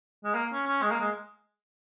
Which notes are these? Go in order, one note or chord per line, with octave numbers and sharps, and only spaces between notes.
G#3
A#3
C#4
C#4
G#3
A#3
G#3